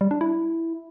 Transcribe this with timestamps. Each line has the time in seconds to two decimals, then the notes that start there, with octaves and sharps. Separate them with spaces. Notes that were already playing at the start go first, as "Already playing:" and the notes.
0.01 G3
0.11 D4
0.21 E4